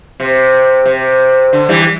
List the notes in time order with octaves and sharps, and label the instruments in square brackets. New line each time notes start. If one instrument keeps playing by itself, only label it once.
[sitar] C3
C3
D3
E3 G3